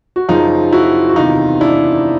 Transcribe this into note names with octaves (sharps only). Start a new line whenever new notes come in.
F#4
F#2 C#3 F3 D#4 F4
E4 F#4
F#4
E2 C3 D#3 D#4 F4
D4 E4